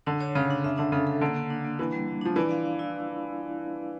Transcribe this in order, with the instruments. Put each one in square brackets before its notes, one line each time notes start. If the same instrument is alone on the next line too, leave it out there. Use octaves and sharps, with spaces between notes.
[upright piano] D3 [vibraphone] D4
[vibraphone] C#5
[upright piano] C#3 [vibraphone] C#5
[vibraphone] D4
[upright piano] C#3 [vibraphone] E5
[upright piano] D3 [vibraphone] D4
[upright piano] C#3 [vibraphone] A4
[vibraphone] A4
[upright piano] D3 [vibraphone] A#3
[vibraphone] A#3
D4
A#3
[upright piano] E3 [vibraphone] D4
[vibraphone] G3
G3
[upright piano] F3 [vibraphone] D4
[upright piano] E3 [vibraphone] D5
[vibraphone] F5
F5
E4